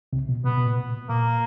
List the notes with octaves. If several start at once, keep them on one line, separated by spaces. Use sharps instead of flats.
C2 C3
B2
B2 B3
B2
A#2
A#2 A#3